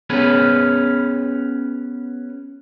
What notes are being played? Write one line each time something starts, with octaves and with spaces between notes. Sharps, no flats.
B3 C#4 G#4 B4